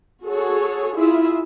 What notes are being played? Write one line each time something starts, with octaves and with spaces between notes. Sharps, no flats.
F#4 G#4 A4 C#5
E4 F4 G#4 E5